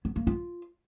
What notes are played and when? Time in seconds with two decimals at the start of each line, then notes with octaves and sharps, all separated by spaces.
0.05 B3
0.16 A#3
0.27 F4